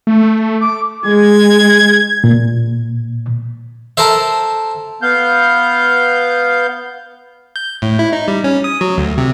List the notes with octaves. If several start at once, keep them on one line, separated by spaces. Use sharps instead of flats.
A3
D6
G#3 G#6
A#2
A4 A#4 C5 E5
B3 F5 G6
G6
A2
E4
D#4
G3
C#4
D#6
F#3
D2
C3